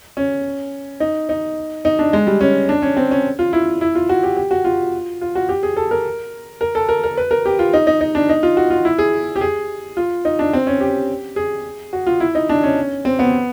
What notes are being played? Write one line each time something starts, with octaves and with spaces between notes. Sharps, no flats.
C#4
D#4
D#4
D#4
D4
G#3
G3
C#4
D4
C#4
C4
C#4
F4
E4
E4
F4
F#4
G4
G4
F#4
F4
F4
F#4
G4
G#4
A4
A#4
A#4
A4
A#4
A#4
B4
A#4
G4
F4
D#4
D#4
D#4
D4
D#4
F4
F#4
F4
E4
G#4
G4
G#4
F4
D#4
D4
C4
C#4
G4
G#4
F#4
F4
E4
D#4
D4
C#4
C4
B3